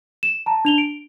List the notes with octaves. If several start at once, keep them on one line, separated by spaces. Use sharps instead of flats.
E7
A5 A#5
D4 F7 G7
D7